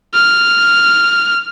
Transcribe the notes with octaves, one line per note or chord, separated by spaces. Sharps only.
F6